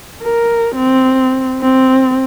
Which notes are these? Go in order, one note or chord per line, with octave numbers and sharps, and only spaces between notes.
A#4
C4
C4